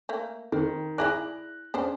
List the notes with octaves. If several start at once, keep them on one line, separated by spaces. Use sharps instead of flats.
A3 A#3
D#3 C4
E4 G#4 D5 F#6 A#6 F#7
B3 C#4 D4 G#4 C5